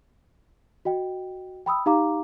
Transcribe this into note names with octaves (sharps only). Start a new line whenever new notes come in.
F#4 D#5 G5
G5 B5 D#6 E6
D#4 G4 F5 A#5 D6